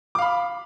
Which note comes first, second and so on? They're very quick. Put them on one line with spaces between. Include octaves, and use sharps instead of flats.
D6 F5 B5